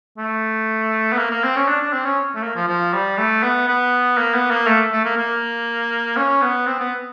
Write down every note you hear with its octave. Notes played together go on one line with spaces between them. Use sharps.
A3
B3
A#3
A#3
C4
C#4
D4
D4
C4
C#4
A3
A#3
F3
F3
G3
A3
B3
B3
A#3
B3
A#3
A3
A3
A#3
A#3
C#4
B3
C4
B3